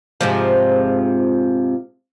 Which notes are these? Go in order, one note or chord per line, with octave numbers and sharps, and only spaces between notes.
G#2 C3 F3